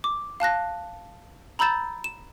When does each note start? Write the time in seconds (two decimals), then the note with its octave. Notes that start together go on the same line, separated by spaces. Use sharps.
0.04 D6
0.40 F5 A5 F#6 A#6
1.59 A#5 B5 E6 G6 A6 E7
2.04 E7